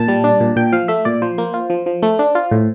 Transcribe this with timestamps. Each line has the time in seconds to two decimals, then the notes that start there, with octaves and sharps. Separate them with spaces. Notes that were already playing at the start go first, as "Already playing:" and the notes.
Already playing: A#2 A5
0.08 G3
0.24 D4
0.40 A#2
0.56 A#2 G5
0.72 F3 F5
0.88 A3 E5
1.05 A#2 D5
1.22 F3 C5
1.38 A#3
1.54 F4
1.70 F3
1.86 F3
2.03 A3
2.19 D4
2.35 F4
2.51 A2